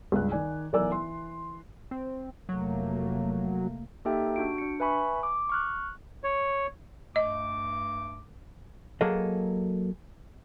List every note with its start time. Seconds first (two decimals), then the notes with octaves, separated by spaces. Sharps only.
0.12 C#2 G2 F#6
0.32 D#3 D5 G#5
0.73 B1 E3 A#4 D5 G#5 E6
0.90 E3 C6
1.91 C4
2.49 F1 F#3 A3 A#3
4.05 A#3 D#4 G4 A4 E5 G5
4.36 D4 F#4 D7
4.58 D4 C#7
4.80 B4 E5 G#5 B5 C#6
5.23 D6
5.49 C#6 F6 F#6
6.24 C#5
7.16 G2 A3 D#5 D6
9.01 F#3 A#3 G#4 A4 D#5